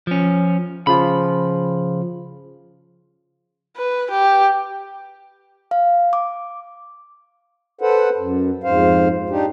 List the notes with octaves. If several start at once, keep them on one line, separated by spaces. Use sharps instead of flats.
F3 C#4
C#3 F3 F4 B5
B4
G4
F5
D6
A4 B4 C5 F#5
F#2
F2 G#2 C5 F5
D4 D#4 G4